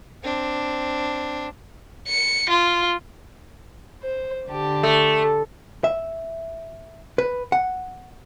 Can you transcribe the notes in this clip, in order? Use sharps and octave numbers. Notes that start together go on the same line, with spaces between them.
C4 D4
C#7
F4
C5
D3 G4 A5
A3
E5
B4
F#5